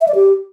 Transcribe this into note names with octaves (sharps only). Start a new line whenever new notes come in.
E5
D5
G4